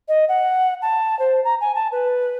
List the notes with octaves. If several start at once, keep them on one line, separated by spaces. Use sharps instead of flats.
D#5
F#5
A5
C5
A#5
G#5
A5
B4